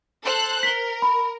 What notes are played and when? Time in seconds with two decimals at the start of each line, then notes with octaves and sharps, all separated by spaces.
0.23 A4 C5 F#6
0.63 A#4 B6 G7
1.02 B5